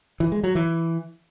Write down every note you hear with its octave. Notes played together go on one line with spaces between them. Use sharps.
E3
G#3
F#3
E3